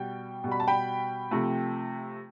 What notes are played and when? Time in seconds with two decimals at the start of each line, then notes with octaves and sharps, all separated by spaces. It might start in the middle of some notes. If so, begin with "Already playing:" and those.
Already playing: B2 G3 G5
0.44 B2 G3
0.52 B5
0.60 A5
0.68 G5 B5
1.31 C3 F3 A3